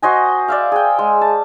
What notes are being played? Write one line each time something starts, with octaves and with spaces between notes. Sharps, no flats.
F#4 C5 D#5 G#5
D5 E5 F5
G#4 G5
G#3
A5